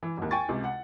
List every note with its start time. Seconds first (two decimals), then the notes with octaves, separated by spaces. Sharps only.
0.03 E3
0.17 G#1 D#2
0.31 G5 G#5 C#6 A6
0.49 C#2 C3
0.64 F#5